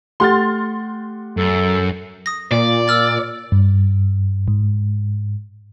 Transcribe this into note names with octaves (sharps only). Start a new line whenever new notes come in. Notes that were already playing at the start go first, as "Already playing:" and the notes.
A3 G4 F#5 C6 F6 A6
F#2 A4
D#6 A#6
A#2 D5
E6 F6 A6
G2
G#2